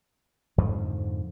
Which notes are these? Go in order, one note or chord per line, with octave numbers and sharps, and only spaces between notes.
F2 G#2 D3 F3